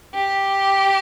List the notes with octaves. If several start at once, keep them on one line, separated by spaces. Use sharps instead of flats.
G4